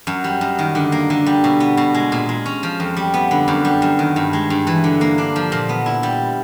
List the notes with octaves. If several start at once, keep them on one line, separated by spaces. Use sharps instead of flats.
F#2
G3
F#2
D#3
D3
A#3
D3
G3
B2
B3
B2
G#3
A#2
G#3
C#4
F3
F2
G3
B3
D3
F#2
G3
F#2
D#3
G2
G#3
G2
E3
D3
A#3
D4
F3
A#2
B3
E4
G3